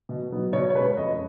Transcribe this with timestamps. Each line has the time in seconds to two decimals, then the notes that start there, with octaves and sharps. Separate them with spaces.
0.09 B2
0.31 F#3 B3 D#4
0.53 B2 C#5
0.70 C#5
0.75 G#3 B4
0.79 C#4
0.97 F2 D#5